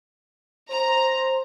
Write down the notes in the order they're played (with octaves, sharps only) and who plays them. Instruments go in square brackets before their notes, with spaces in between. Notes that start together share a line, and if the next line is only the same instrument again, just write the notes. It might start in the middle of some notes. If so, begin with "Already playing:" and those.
[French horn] C5 [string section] A#5